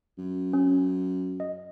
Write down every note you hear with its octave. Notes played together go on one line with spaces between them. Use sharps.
F#2
C#4
D#5